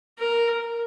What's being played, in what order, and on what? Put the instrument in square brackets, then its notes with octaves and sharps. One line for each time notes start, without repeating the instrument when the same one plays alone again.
[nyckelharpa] A#4